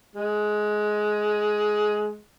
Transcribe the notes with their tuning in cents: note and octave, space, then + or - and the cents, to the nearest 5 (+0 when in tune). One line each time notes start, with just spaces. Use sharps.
G#3 +15